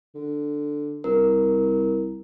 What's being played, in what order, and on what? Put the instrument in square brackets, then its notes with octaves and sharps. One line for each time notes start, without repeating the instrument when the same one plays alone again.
[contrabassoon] D3
[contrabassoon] C2 [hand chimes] A#4